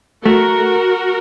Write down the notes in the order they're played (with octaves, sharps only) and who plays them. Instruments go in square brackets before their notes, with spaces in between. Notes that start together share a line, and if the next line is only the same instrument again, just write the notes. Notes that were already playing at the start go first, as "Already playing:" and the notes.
[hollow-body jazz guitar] A3 [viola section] F#4 A#4